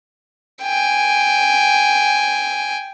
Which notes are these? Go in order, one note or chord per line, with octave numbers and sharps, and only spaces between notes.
G5 G#5